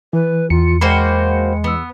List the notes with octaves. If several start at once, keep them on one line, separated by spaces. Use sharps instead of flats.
E3 B4
E2 F4 C#7
G#3 A#3 F#4 C5 G5 B5
E2 B3 E6